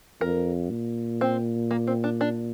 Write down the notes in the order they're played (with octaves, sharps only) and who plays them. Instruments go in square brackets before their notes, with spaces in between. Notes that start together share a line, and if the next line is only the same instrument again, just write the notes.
[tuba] F2 [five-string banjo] A#4
[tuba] A#2
[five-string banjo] C4
A#3
C4
D4
D4